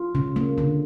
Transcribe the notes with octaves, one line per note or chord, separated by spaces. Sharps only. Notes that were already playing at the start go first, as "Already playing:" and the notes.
Already playing: F4
C#3
A#3
D3